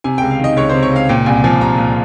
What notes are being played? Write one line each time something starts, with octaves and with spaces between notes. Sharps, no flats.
C3 G#5
C#2 G5
F5
D#3 D#5
C#2 C#5
C3 C5
C#5
C#2 F5
A#2 G5
C2 G#5
F3 G#5
C2 A#5
A#2